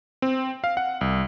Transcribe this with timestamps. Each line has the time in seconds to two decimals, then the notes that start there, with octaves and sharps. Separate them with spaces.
0.22 C4
0.64 F5
0.77 F#5
1.01 C2